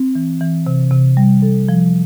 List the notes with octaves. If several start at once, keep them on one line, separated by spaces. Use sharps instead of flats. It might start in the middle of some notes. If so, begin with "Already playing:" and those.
Already playing: C4
E3
E3
C3
C3
G3
A4
F3